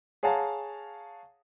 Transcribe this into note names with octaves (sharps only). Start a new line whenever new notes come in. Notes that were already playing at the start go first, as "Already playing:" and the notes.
G#4 C#5 F5 F#5 A5 A#5